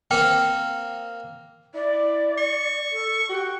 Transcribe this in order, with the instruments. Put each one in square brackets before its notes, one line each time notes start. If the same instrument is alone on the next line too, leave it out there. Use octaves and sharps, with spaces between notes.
[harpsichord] A#3 C4 [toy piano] G5 [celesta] F6
[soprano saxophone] E4 [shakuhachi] D5
[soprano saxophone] C#6
[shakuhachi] A4
[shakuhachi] F#4 [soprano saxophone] G4